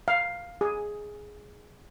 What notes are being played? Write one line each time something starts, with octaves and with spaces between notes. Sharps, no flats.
F5
G#4